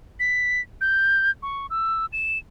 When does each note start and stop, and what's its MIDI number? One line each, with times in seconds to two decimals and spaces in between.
0.20 0.61 95
0.81 1.31 91
1.43 1.67 85
1.70 2.06 88
2.13 2.38 100